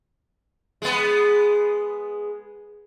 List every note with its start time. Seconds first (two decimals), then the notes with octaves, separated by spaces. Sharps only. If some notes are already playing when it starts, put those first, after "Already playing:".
0.82 G#3 B3